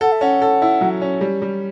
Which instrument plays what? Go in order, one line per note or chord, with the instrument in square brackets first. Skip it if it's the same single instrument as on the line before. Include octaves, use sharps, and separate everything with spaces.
[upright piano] A4 [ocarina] F#5
[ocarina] E5
[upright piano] C#4 [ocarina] F#5
[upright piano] A4
E4
F#3
C#4
G3
G3